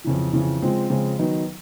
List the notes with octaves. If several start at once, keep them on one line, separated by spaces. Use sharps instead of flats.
F2 C#3 E3
F2 C#3 E3
C#3 F3 G#3 C4 F4
C#3 F3 G#3 C4 F4
D#3 F#3 B3 D#4